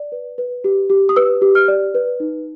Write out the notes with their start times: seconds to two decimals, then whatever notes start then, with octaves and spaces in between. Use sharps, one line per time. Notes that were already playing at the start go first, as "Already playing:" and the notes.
Already playing: D5
0.12 B4
0.38 B4
0.64 G4
0.90 G4
1.09 D#6
1.16 B4 E6
1.42 G4
1.55 F6
1.68 D5
1.95 B4
2.20 D#4